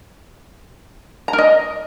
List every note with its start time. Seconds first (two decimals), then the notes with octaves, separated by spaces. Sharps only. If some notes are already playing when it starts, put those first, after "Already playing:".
1.28 A#5
1.33 A#4
1.38 D#5